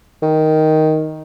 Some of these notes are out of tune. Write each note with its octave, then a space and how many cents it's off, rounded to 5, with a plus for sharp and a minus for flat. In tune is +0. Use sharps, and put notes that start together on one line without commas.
D#3 +5